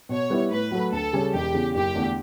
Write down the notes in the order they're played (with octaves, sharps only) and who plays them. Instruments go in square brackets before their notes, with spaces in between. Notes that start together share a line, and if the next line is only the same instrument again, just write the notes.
[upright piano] B2 [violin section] C#5
[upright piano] G3 B3 E4
[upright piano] A2 [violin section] B4
[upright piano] F#3 A3
[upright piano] D2 [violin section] A4
[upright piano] C#3 G3 C#4
[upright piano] E1 [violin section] G4
[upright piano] E2 C#3
[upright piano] F#1 [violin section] G4
[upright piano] E2 D3 A3 D4